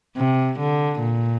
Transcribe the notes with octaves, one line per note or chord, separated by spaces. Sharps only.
C3
D3
A#2